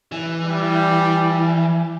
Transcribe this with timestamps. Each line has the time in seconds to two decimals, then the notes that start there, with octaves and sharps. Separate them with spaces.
0.12 E3
0.43 G3